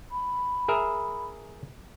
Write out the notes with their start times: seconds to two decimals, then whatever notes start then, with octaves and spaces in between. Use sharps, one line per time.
0.11 B5
0.68 G#4 A#4 E5